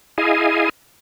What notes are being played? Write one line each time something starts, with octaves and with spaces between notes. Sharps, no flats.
E4 G#4 D#5 F5 G#5